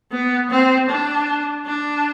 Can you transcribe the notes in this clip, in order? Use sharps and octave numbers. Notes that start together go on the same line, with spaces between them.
B3
C4
D4
D4